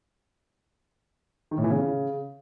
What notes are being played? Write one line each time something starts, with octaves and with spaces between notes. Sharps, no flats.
D#3
A2
E3
C#3